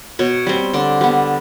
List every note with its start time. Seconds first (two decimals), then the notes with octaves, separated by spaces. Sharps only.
0.19 B2 C#5
0.47 G3 C4
0.73 D3 D5
1.01 G3 B3